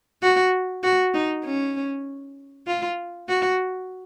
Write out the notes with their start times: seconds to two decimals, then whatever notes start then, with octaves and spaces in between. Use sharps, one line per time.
0.22 F#4
0.83 F#4
1.14 D#4
1.45 C#4
2.67 F4
3.28 F#4